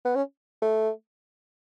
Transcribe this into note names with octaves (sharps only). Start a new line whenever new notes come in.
B3
C#4
A3